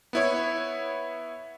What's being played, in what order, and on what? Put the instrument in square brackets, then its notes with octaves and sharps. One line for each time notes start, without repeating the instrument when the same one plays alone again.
[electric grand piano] B3 E4 C#5